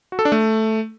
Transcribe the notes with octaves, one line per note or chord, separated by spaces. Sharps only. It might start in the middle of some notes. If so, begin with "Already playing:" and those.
F#4
A4
D4
A3